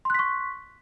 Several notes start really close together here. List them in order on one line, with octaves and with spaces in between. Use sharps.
C6 F#6 B6 C#6